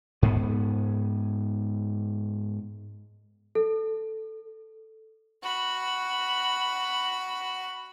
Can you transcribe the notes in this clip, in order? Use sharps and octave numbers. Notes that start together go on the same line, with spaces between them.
G#2 B3
A4
F#4 B5